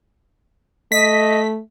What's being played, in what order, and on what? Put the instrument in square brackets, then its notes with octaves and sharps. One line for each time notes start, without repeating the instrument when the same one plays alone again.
[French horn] A3 [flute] D#5 [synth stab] B6